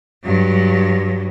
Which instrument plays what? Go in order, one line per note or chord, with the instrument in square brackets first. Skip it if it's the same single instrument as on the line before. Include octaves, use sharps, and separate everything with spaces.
[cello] G2 F#3